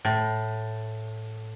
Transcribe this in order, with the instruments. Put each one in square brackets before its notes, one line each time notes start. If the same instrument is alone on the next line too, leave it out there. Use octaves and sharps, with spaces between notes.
[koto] A2